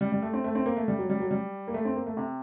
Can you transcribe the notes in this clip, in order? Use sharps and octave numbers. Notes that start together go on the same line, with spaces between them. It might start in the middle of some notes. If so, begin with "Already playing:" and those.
G3
G3
A3
C4
A3
C4
A#3
A3
G3
F#3
G3
F#3
G3
A#3
A3
C4
A#3
A3
C3